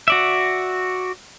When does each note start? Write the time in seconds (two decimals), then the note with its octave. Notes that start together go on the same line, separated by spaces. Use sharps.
0.08 F#4 D5 E5